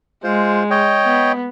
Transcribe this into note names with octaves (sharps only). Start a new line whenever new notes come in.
G#3 F4 C5
C#5 D#5 G5
B3